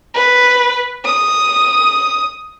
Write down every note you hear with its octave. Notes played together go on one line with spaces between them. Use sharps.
B4
D#6